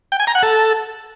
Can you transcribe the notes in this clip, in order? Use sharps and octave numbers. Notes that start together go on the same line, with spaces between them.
G5
G#5
A#5
F#5
A4